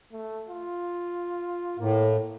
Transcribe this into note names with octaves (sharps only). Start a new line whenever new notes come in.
A3
F4
A2 A#3